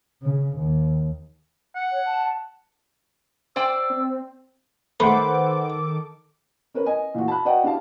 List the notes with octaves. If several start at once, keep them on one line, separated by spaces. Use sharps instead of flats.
C#3
D#2
F#5
C#5
A5
C5 D5 G5 E6
C4
D#3 A3 A4 B4 C5 F#5 D6
C#4 A#4 B4
D#5 G#5
A#2 E3 F#4
A5 B5 F#6
F#4 B4 D5 D#5 F#5 G5
D4 E4 G4 F5 A5